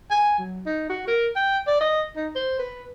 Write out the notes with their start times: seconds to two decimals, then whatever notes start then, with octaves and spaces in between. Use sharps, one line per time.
0.11 G#5
0.38 F#3
0.66 D#4
0.90 F#4
1.08 A#4
1.36 G5
1.67 D5
1.81 D#5
2.16 D#4
2.35 C5
2.59 B4